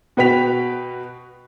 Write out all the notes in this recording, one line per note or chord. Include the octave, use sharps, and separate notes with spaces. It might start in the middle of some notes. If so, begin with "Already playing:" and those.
B2 F#4 B4 G5 B6 F7